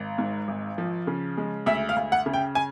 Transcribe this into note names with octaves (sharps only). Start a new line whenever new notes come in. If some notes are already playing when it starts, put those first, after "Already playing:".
Already playing: G#1
G#2
G#1
F3
C#3
G#3
D2 E5
F5
D2
F#5
C#3
G5
G#5